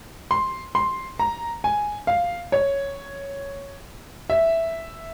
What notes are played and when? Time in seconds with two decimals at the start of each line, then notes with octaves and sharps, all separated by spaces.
0.31 C6
0.75 C6
1.19 A#5
1.64 G#5
2.07 F5
2.52 C#5
4.30 E5